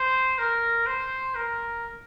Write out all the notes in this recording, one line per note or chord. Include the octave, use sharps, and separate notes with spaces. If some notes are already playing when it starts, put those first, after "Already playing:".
Already playing: C5
A#4
C5
A#4